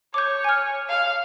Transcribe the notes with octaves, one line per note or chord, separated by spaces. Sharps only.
C#5 D6 G6
G#5 F6
F5